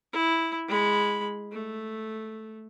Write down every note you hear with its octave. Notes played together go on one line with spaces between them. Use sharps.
E4
G#3 B5
A3